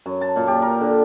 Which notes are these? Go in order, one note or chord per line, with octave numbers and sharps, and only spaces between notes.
F#2
A5
A#2
G4
A#4
D3